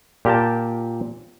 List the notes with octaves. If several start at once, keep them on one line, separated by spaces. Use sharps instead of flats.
A#2 G4 A#4 G5 A5